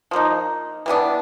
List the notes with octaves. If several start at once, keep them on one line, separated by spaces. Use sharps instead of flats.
F3 A#3 D#4
E3 G3 B3 D4